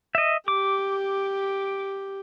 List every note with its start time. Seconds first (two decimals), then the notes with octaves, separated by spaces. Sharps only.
0.15 D#5 E5
0.48 G4 D6